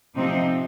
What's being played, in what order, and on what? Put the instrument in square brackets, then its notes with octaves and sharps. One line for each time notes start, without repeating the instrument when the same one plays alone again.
[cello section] C3 F3 C4 D#4